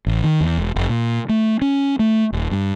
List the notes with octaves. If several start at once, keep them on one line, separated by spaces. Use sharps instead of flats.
A1
D#3
E2
E1
F1
A#2
A3
C#4
A3
D#1
G2